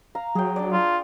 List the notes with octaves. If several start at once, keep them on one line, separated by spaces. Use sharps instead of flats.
F5 A#5
F#3 G#4 G5
D4 D5
F4